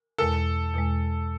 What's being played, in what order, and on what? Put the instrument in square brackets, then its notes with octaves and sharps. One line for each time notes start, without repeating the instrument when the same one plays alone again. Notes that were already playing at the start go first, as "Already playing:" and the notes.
[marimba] E2 B2 G#3 [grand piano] A4
[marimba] E2 B2 G#3